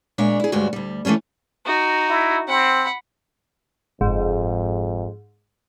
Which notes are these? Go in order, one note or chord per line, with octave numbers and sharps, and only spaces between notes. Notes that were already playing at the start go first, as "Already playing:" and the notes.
A#2 G#3 D4 C#5 E5
E4 G#4
D2 G2 G3 G#3 F#4 C#5
D2 G3
E3 A3 A#3 C#4 C#5
D#4 F#4
E4
C4 F#5 B5
F#1 F2 G#2